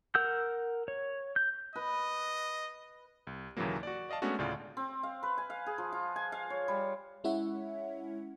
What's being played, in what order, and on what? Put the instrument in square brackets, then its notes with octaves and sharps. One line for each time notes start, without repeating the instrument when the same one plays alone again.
[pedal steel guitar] A#4 F#5 E6 G6
C#5
G6
[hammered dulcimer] B4 [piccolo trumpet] D#5
[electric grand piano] C2
D#2 A#2 C#3 E3 F#3 A#3
F#4 D5
D5 D#5 F5 A5
G#3 A3 B3 C#4 D4 F#4
D2 A2 C#3 F4 D5
[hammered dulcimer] C4
F5
B4
G#5
F5
G#4
F3
F4
G#5
F5
C#5
G3
[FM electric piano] G#3 C#4 E4 C#5 E5 F#5